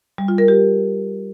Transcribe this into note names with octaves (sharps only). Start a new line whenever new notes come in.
G3
F4
A#4
G4